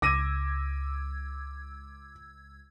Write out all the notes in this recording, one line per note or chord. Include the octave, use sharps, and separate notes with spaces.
C#2 D6 E6 G#6 A#6 D#7